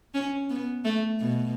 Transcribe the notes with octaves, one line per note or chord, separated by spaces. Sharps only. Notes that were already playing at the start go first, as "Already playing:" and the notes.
C#4
B3
A3
B2